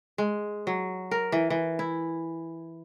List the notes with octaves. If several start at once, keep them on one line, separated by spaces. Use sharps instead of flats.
G#3
F#3
A#4
E3
E3
E4